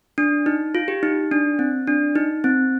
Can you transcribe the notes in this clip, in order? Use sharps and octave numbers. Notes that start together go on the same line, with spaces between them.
D4
D#4
F4
G4
D#4
D4
C4
D4
D#4
C4